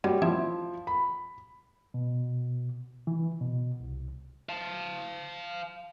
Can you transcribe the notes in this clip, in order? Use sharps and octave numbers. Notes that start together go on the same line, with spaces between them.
F#3 G3
F3 E4 E5
B5
B2
E3
B2
C2
F5 A5